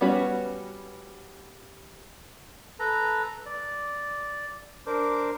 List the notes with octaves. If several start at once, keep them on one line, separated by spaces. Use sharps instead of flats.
G3 B3 C#4 F#4 B4
A4 B4 A#5
D5
D4 A#4 C5 D6